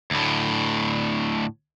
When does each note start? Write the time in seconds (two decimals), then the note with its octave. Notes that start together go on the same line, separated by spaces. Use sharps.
0.11 D2 A2